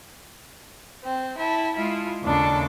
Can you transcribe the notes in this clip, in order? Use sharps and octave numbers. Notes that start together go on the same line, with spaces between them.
C4
E4 A5
G#3 E4 F4
D#2 C#3 D4 A4 D6